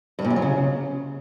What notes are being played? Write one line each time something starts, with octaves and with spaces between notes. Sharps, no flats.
G2
A#2
F#2
F#3
C#3